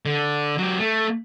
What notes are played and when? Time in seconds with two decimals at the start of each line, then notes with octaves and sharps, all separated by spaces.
0.06 D3
0.58 F#3 G4
0.80 A3